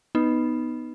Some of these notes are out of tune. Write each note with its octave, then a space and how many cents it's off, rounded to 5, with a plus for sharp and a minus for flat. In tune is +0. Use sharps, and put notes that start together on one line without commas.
B3 +0 D#4 +0